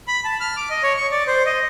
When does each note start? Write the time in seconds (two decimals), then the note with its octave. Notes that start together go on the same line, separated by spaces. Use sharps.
0.08 B5
0.25 A5
0.40 F6
0.57 D6
0.70 D#5
0.83 C#5
0.97 C#6
1.11 D5
1.27 C5
1.46 D#5